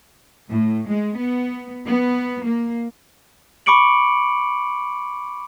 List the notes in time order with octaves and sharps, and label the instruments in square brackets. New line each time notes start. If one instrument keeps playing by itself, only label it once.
[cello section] A2
G#3
B3
B3
A#3
[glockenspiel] B5 C#6 D6 C#7 D7 F#7